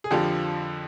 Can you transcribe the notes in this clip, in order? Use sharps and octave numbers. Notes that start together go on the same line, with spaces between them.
G#4
F2 D3 F3 G4